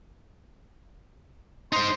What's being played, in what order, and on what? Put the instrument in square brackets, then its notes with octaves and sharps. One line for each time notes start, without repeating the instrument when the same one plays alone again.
[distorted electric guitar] D#4 C5 [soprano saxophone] C6